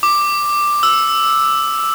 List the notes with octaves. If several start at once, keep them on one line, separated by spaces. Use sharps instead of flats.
D6
E6